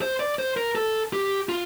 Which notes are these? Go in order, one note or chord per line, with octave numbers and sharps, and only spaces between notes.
C5
D5
C5
A#4
A4
G4
F4